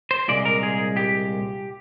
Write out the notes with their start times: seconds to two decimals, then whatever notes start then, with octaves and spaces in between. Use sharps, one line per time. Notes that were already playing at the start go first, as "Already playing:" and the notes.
0.11 C5
0.28 C2 A#2 G#3 D5
0.45 A#4
0.63 G#4
0.97 G4